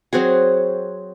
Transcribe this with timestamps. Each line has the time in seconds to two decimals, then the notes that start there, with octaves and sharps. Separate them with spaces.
0.13 F#3 C4 F#4 G#4